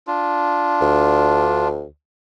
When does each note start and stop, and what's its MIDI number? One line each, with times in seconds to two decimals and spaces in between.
0.07 1.68 62
0.07 1.68 65
0.81 1.86 38